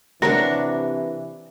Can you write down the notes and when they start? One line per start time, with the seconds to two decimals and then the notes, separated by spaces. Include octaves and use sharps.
0.22 C3 E3 D4 A#4 C#5 F#5